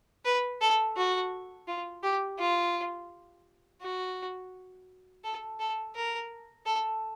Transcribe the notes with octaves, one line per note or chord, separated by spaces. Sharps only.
B4
A4
F#4
F4
G4
F4
F#4
A4
A4
A#4
A4